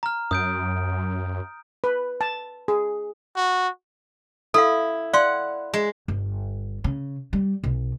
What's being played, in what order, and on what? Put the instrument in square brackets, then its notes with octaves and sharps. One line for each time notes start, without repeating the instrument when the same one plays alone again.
[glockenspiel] A#5 F6
[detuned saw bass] F#2 [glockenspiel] D#6 G6 D7
[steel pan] B4
A5
G#4
[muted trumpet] F#4
[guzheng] E4 [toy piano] A4 F5
[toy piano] D5 F5 C6 [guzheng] F#5
[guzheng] G#3
[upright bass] G1
C#3
G3
B1